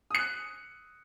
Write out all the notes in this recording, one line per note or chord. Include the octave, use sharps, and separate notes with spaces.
D#6 F#6 C#7